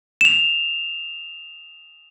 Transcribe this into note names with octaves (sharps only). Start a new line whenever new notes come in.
E7 F7